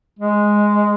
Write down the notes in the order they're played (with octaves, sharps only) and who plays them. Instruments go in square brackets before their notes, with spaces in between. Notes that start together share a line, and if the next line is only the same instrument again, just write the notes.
[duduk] G#3